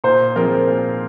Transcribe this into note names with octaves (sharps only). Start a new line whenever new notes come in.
A#2 C5
F3 C4 F4 G#4 A#4
A#2